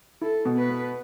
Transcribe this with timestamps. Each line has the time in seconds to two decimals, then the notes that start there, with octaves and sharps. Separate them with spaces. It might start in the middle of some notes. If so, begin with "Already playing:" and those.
0.21 E4 A4
0.45 B2
0.58 B4
0.70 B3